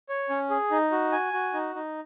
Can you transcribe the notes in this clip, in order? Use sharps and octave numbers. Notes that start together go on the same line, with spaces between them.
C#5
C#4
G#4
D#4
F#4
G#5
F#4
D#4
D#4